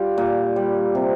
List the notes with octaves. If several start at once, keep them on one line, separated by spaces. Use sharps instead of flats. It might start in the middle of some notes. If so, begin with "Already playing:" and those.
Already playing: G3 F4 G4
A#2
G3
C3